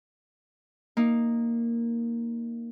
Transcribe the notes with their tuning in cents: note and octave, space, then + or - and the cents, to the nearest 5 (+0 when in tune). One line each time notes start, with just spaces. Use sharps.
A#3 +0 D#4 +0